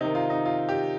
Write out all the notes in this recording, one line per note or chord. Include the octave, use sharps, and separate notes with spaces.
C3 D#3 D#4
F4
D#4
F4
G4